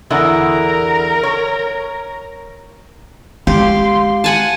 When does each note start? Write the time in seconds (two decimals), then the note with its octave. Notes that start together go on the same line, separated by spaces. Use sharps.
0.10 E2 D3 E4 A#4
1.23 C#5
3.47 G#3 G4 F5 C6
4.24 F#5 G#5 A5 D#7